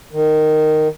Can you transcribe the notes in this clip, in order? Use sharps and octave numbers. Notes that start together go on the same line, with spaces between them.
D#3